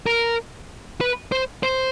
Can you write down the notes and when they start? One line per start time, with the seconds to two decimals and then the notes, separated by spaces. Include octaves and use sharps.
0.06 A#4
1.01 B4
1.32 C5
1.63 C5